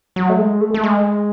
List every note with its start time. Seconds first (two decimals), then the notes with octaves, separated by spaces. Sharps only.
0.16 F#3
0.29 A3
0.38 G#3
0.61 A3
0.74 A3
0.84 G#3